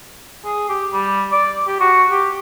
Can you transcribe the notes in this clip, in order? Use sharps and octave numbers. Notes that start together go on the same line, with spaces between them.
G#4
G4
G3
D5
G4
F#4
G4